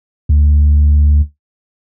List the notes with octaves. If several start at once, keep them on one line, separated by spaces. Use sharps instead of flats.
D2